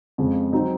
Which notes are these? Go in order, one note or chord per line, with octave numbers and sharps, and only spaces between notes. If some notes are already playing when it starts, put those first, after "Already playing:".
F2 C#3 G#3
F#3 C4 D#4